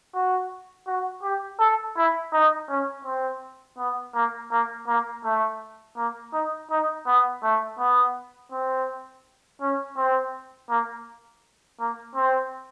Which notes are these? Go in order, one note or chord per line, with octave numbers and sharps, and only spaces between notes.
F#4
F#4
G4
A4
E4
D#4
C#4
C4
B3
A#3
A#3
A#3
A3
A#3
D#4
D#4
B3
A3
B3
C4
C#4
C4
A#3
A#3
C4